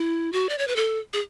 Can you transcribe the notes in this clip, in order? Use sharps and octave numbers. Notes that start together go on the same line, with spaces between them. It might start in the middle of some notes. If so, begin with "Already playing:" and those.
Already playing: E4
F#4
D5
C#5
B4
A4
G#4